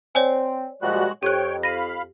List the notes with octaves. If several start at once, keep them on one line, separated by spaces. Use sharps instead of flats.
C4 C#5 D5 G#5
A#2 F3 G3 G#3 F#4 F#6
F2 G4 C#5 G5 F#6
F5 B5 A#6 D#7